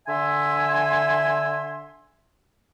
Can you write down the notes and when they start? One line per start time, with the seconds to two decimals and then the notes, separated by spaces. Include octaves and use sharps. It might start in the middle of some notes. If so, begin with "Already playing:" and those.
0.07 D3 E5 G#5 C6